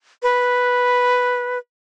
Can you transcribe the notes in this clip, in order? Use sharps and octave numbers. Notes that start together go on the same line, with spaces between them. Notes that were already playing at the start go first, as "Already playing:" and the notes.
B4